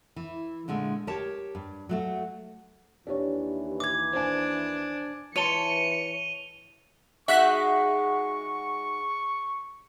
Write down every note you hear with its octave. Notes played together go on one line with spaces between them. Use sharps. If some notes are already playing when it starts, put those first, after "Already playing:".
E3
A#2 D3 G#3 A3
G4 A#4 C#5 A5
G2
F#3 A3 F#4
D#2 E3 D4 G4 C#5
D6 G#6
D4 C5 G#5
E3 C#5 A5 C6 C#7 D#7 F7 G7
G#3 D#4 F#4 E5 F#5 C#6 F#6 B6